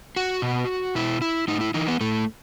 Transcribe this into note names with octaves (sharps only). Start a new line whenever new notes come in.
F#4
B2
B2 E4
E4
A2 D#4
E4
E3 D#4
B3
A2 A3